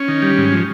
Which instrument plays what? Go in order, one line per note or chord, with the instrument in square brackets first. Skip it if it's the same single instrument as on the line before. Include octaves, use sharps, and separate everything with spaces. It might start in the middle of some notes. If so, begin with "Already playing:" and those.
Already playing: [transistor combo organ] C#4
D#3
G3
G#2
F3